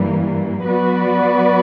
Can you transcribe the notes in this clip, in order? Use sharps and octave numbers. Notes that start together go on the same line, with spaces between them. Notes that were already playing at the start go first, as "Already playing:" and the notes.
Already playing: G2 E3 G3 A#3
F#3 B3 F#4 B4 D5